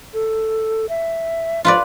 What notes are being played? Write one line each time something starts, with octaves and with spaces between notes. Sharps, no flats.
A4
E5
F3 F4 B4 D5